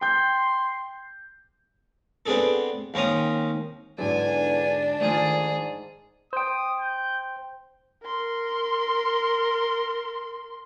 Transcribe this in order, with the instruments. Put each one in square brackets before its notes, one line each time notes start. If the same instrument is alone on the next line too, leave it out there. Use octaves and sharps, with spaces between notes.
[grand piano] G5 G6 [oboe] C6
[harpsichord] B3 C4 D4 G#4 A4
D#2 C4 C#4 A#5 D#6
[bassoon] E2 [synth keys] G#2 D3 F#3 [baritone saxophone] D4 [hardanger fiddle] G#5
[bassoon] G#2 [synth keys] D#3 F3 A3 [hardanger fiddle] G#4
[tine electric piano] C5 G5 [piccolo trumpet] D#6
[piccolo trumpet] G6
[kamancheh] A#4 C6